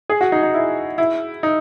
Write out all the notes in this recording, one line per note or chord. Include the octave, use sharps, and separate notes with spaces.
G#4
F#4
D#4
D#4
E4
E4
D#4